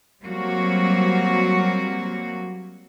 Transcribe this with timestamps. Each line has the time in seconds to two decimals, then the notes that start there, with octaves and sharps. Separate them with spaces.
0.22 F#3 G3 A#3 C4 F#4